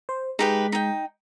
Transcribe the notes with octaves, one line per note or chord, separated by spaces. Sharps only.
C5
G#3 D#4 G4 B4 B6
D#4 G5